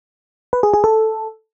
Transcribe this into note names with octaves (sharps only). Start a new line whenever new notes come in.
B4
G#4
G#4
A4